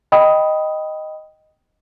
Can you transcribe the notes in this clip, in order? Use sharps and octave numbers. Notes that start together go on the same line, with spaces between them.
D#5 G5 B5 D#6